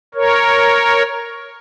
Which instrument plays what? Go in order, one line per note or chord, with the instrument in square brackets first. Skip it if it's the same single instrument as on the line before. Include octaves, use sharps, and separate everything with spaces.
[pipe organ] A#4 C#5